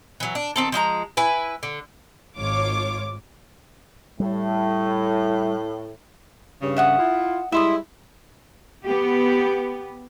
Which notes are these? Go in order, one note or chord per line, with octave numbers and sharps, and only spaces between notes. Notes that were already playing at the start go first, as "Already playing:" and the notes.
E3 F#3
D4
D#3 C4 A4
F3 G#3 D#5 A#5
E4 B4 G#5
D3
G#1 F4 C#5 D6
A2 G3
G2 C#3
E5 F#5 D#6
E4 F4
G3 G#3 E4 E5 C6 D#6
B3 G4